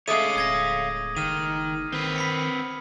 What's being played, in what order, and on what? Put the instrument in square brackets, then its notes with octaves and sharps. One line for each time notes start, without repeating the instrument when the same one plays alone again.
[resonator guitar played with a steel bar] G#3 A3 [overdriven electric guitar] C#5 F5 [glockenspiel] D6 D#6 D#7
[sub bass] D1 [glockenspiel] D#6 G#6 A#6
[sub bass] F#1 [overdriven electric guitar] D#3 [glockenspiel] F6 D#7
[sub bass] D#3 [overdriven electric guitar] C4 B4
[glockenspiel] B5 B6 C#7